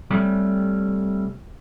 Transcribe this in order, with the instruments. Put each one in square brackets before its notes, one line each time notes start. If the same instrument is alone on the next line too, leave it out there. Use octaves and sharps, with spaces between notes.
[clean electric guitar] C3 G3 A3 C#4